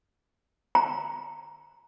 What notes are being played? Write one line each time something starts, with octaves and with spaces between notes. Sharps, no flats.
A#5